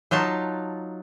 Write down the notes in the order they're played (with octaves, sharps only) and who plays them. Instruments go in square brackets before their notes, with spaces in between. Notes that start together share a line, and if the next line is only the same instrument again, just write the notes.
[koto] F#3 D#4 F4 A5